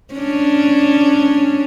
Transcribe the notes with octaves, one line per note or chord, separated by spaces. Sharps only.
C#4 D4